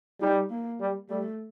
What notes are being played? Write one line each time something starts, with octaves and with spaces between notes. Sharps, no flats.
G3 D#4
A#3
G3
G3 A3